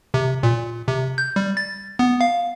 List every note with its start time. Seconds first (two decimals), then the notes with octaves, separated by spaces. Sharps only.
0.14 C3
0.43 A#2
0.88 C3
1.18 G6
1.36 G3
1.57 A6
1.99 B3
2.21 F5